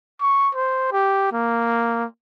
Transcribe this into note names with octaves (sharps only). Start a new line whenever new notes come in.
C#6
C5
G4
A#3